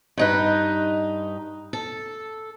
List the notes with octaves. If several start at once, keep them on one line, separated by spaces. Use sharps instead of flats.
G2 D#4 B4
A4